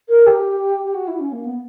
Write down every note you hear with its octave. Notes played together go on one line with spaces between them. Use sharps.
A#4
G4
G4
F#4
E4
C#4
A#3
B3